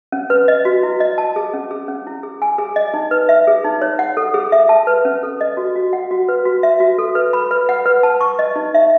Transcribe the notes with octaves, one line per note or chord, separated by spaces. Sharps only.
C#4
B4
D#5
F#4
E4
D#5
A5
G#4
C#4
G#4
C#4
E4
G#4
G#5
G#4
D#5
D#4
B4
E5
G#4
D#4
C#5
F#5
A4
G#4
E5
A5
B4
C#4
A4
D#5
F#4
F#4
F#5
F#4
B4
F#4
E5
F#4
A4
B4
B5
B4
F#5
B4
A5
C#6
D#5
D#4
E5